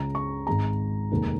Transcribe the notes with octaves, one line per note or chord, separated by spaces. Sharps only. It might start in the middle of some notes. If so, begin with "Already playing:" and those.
Already playing: C#2 C#3 G#3 A#5
C#6
G#1 G#2 G#3 A#5
F1 D#2 D#3 G#3